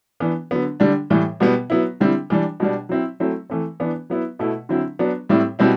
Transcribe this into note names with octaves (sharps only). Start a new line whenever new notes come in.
E3 B3 D4
D3 F#3 B3
D3 G3 D4
A2 E3 G3
B2 G3 B3
F#3 B3 E4
D3 G3 C4 E4
E3 G3 D4
B2 G3 D4
F#3 C4 E4
F#3 A3 C4 E4
E3 A3 C4
E3 B3 D4
F#3 B3 E4
B2 A3 E4
D3 F#3 C4 E4
F#3 B3 D4
A2 G3 C4 E4
B2 G3 C4 E4